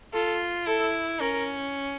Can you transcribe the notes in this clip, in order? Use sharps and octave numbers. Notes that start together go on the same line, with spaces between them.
F4 A4
E4 A4
C#4 A#4